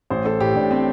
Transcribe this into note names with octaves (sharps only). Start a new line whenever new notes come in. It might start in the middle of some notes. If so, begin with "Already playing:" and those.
A1 C5
A1 A4
A2 G4
A2 D4
C4